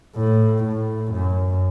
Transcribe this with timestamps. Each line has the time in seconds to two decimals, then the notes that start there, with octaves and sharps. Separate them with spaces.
0.16 A2
0.64 A2
1.12 F#2